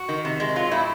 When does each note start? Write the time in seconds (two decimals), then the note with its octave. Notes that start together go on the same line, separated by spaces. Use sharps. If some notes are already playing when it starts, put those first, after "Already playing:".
Already playing: F#4
0.09 D#3
0.25 C3
0.40 G#3
0.56 F#3 F4
0.71 A2 E4